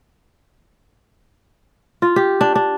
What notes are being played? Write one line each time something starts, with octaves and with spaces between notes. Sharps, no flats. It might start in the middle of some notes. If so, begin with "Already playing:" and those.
F4
G4
D4
D4